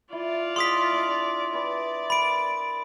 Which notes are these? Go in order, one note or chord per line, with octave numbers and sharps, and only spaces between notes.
E4 F4 D5
G#3 F#5 C6 D#6 B6
D4 E5
B4 D5 E5 G#5
A#4 B4 F#5 B5 D7